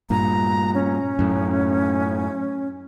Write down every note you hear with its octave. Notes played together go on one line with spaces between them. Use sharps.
G2 A#2 A#5
C#4
F#2 A2